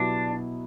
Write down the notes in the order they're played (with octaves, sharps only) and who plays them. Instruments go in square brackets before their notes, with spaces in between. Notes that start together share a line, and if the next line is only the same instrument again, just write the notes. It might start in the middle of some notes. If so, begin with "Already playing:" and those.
Already playing: [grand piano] B2 F#3 B3 E4 G4 [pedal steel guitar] D4